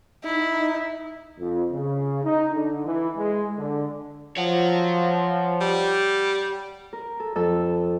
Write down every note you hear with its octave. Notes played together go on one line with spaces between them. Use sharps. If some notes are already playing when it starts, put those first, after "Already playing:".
D#4 E4
F2
C#3
D#4
D3
E3
G#3
D3
F3 C#5 F#5
G3
A#4
A4
F2 A4 E6